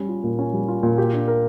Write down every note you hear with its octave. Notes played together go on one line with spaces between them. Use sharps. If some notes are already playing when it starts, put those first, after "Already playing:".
Already playing: G3 C#4
F4
A#2
C#4
G3
F4
A#2
G4
D4
A#4